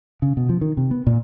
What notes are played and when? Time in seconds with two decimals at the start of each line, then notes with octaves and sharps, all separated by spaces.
0.22 C#3
0.37 B2
0.49 F3
0.61 D#3
0.77 C3
0.91 B3
1.07 A#2